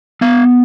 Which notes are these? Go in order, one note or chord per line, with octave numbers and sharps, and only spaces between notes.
B3 F5